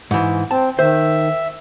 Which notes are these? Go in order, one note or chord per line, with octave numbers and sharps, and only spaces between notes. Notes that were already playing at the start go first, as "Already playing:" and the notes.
G#2 E3
C4 A5
D#3 C5 E5